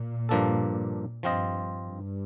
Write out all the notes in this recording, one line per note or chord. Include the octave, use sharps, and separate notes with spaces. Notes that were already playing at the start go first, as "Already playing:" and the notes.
Already playing: A#2
G2 F3 A#3 D4 A4
G2 F3 C4 F4 C5 D#5
G2